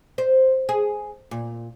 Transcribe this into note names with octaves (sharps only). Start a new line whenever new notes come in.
C5
G#4
A#2